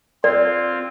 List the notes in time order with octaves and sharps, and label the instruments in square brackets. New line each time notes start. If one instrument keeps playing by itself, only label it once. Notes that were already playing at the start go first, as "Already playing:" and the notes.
[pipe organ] C4 F4 [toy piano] D5